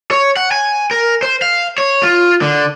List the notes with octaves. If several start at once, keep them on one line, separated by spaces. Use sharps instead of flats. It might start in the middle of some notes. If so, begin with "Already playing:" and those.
C#5
F#5
G#5
A#4
C5
F5
C#5
F4
D3